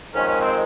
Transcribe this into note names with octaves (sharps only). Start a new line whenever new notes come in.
F2 D#3 G#3 C#4
C#4
C4